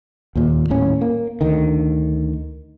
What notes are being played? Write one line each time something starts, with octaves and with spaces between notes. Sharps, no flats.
D#2 A#2
D#1 A2 C#4
A#3
D2 D3 D#3